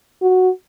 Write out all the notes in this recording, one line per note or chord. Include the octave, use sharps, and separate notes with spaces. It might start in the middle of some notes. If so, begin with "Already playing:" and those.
F#4